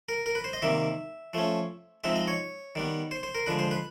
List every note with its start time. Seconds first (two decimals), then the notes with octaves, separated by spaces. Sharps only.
0.09 A#4
0.26 A#4
0.35 B4
0.44 C5
0.53 D#5
0.62 C3 D#3 G3 A#3 E5
1.34 F3 A3 C#4
2.04 F3 G#3 C4 D#4 E5
2.16 D#5
2.28 C#5
2.75 D#3 G3 B3
3.11 C5
3.23 C5
3.35 A#4
3.46 D3 F3 G#3 B4
3.59 C5
3.71 B4